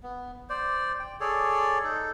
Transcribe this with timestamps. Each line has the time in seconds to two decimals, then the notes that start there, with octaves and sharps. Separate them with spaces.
0.03 B3
0.49 C5 D5
1.00 G5
1.20 G#4 A4 C#5 D5
1.84 D#4 A4